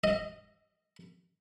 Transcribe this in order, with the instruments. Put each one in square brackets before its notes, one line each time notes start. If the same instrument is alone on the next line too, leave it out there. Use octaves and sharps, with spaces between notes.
[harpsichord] D#5